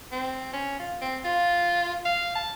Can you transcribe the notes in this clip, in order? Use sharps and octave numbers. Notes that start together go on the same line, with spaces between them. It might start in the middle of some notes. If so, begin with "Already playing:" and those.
C4
C#4
F4
C4
F4
F5
A5